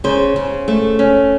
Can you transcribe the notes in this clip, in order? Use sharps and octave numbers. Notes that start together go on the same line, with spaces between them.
C#3 C5
C#3
A3
C#4